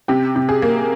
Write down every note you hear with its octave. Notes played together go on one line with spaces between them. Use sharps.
C3 G4
C3
G#4
A#3